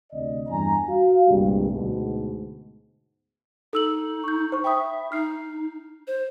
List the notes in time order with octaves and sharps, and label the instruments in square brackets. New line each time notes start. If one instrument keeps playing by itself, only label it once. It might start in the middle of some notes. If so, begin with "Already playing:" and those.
[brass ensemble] D2 C3 D5 D#5
E2 G2 G#5 A#5
F#4 F5
G1 C2 G2 A#2 G#3 G4
D2 G#2 B2
[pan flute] D#4 [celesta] A4 E6 F#7
[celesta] C#6 G6
C5 C#6
[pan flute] E5 [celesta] G5 B5 D#6
[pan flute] D#4 [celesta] F6 C7
[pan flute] C5